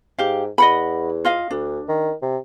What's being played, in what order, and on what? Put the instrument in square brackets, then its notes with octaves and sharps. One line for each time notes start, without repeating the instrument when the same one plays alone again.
[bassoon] G#2 [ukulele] G4 F5
[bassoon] E2 [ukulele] D#5 F#5 B5
[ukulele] F4 D#5 F5
[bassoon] D2 [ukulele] D4
[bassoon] D#3
C3